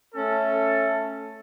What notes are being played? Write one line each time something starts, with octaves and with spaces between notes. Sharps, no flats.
A3 C#4 A4